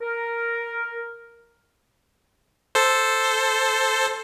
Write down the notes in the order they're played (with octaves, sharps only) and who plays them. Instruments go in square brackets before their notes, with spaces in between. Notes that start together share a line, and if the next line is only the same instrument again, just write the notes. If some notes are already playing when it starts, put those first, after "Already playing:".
[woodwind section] A#4
[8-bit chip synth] A4 C5